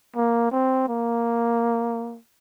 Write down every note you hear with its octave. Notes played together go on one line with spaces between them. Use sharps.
A#3
C4
A#3